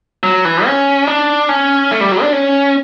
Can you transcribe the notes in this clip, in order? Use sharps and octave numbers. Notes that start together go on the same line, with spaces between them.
F#3
E3
C#4
D4
C#4
A3
G3
F#3
D4
C#4